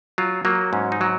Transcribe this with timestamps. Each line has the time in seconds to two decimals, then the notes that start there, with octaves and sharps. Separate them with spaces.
0.18 F#3 F4
0.45 F#3 A#3
0.73 G#2 C#4
0.92 D#4
1.01 F#3